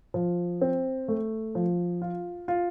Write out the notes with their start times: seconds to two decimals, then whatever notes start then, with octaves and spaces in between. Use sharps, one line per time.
0.14 F3
0.61 C4
1.08 A3
1.55 F3
2.02 F4
2.48 F4